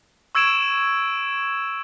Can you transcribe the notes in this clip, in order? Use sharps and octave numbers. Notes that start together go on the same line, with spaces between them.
C#6 E6 G#6 D7 E7